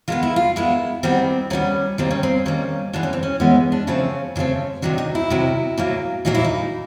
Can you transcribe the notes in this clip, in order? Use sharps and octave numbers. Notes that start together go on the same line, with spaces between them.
D#3 G#3 B3 F4
E4
F4
D#3 G#3 B3 E4
D#3 G3 B3 C4
D#3 G3 B3 C#4
D#3 G3 A#3 C4
C#4
C4
D#3 G3 A#3 C#4
E3 G#3 B3 D4
C#4
C4
C#4
E3 G#3 B3 C#4
D4
C#3 F3 A3 C4 C#4
C#3 F3 A3 C4 C#4
C3 D#3 F#3 D4
D#4
E4
C3 D#3 F#3
A#2 F#3 A#3
A#2 F#3 A#3 D#4
E4
D#4